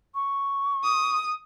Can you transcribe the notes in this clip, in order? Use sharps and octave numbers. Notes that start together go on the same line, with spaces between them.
C#6
D#6